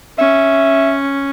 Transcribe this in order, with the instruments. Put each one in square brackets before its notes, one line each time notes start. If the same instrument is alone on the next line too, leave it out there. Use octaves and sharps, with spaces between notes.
[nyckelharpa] C#4 [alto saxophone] E5